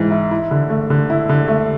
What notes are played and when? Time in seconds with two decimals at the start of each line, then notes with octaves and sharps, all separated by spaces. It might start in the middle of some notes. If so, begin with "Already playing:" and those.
Already playing: G#2 E3
0.11 E4
0.31 E4
0.51 D3
0.70 A3
0.90 D3
1.10 E4
1.29 D3
1.48 A3